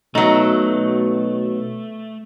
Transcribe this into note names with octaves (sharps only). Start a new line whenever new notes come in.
B2 F#3 A3 D#4